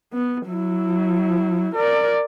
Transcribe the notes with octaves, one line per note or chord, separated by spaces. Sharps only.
B3
F#3 E4
A#4 D5